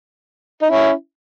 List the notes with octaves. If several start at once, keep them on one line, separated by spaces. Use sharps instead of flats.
D#4
C#4 E4